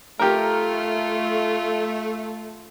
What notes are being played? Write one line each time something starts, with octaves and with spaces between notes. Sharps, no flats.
A3 F4 G4 A#4